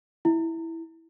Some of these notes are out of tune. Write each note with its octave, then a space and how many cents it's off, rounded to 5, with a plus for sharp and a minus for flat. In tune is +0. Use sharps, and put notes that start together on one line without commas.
E4 -5